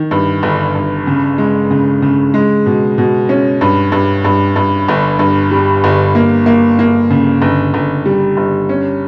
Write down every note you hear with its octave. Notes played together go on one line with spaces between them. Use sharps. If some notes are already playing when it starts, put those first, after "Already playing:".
Already playing: D#3
G2
G1
G2
C#3
G#3
C#3
C#3
G#3
B2
B2
C#4
G2
G2
G2
G2
G1
G2
G3
G1
A#3
A#3
A#3
C#3
G1
G1
G3
G1
C#4